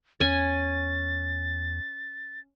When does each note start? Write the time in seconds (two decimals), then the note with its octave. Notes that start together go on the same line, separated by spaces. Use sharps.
0.20 E2 C#4 G#5 A6